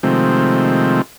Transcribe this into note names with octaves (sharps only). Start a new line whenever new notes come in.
C3 D#3 F3 G#3 A3 C4